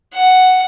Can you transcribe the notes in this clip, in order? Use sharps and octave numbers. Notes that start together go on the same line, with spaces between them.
F#5